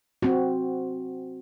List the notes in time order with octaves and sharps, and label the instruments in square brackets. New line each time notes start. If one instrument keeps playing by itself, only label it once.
[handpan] C4 F#4